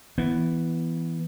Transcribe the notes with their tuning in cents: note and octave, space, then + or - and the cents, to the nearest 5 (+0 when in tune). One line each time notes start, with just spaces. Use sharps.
E3 +0 B3 +0